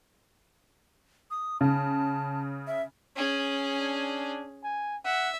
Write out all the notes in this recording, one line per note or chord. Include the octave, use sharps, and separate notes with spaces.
D#6
C#3 A5
E5
C#4 G#4
D4
G#5
E5 F#5